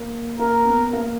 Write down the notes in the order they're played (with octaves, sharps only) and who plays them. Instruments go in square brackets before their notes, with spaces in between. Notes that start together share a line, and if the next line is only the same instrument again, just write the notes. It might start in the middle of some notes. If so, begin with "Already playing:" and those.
Already playing: [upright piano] A#3
[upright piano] A#3 [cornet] A#4
[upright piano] B3
A#3